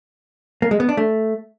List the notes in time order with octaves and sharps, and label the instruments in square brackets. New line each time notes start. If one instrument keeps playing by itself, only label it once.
[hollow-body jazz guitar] A#3
G#3
B3
D4
A3